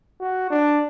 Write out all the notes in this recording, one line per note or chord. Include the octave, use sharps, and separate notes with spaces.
F#4
D4